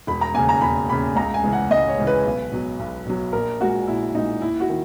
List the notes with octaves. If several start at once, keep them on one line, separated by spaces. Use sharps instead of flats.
E1 B5
A#5
D#2 C#3 G#5
A#5
E1 B5
D#2 C#3 B5
C#2 A#5
G#5
C#3 E3 G#3
F#5
C#2 D#5
C#5
C#3 E3 G#3
B4
B1
B2 F#3
B1
B2 F#3
A#1 A#4
A#2 G#3 F#4
A#1 E4
A#2 G#3 D#4
D#2 E4
F#4
D#3